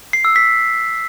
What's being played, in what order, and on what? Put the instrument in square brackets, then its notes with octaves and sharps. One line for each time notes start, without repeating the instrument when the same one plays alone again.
[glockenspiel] C7
E6
B6